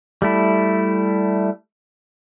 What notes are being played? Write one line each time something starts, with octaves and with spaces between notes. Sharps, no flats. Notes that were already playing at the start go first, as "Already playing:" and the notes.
G3 A3 E4